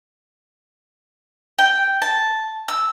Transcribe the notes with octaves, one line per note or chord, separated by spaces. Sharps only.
G5
A5
E6